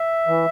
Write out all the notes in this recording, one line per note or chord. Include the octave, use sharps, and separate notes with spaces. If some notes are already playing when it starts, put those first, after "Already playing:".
Already playing: E5
E3